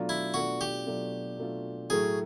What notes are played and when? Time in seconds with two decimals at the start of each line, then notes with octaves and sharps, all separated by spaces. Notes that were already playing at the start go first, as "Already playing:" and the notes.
Already playing: B2 F#3 A3 D4 F4
0.09 E4
0.34 B2 F#3 A3 D4 F4 F#4
0.61 G4
0.86 B2 F#3 A3 D4 F4
1.38 B2 F#3 A3 D4 F4
1.90 A2 F#3 A3 G#4